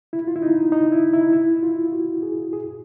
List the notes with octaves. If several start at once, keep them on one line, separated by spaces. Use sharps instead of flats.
E4
F4
E4
D#4
D#4
E4
E4
E4
F4
F#4
G#4
G#4